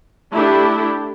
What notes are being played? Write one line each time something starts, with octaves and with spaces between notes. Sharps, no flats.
A3 D4 E4 G4